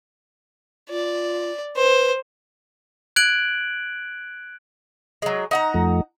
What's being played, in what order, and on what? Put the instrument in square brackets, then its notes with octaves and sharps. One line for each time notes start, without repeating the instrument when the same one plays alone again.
[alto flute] F4 [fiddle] D5
[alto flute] B4 [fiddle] C5
[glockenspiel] F#6 G#6 D7 F#7
[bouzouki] F#3 G#3
D#4 F#5 A#5
[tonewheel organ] F2 F3 A3